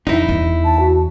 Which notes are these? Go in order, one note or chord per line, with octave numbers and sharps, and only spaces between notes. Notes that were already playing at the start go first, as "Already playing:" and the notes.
F2 D#4 E4
E2
A5
F#4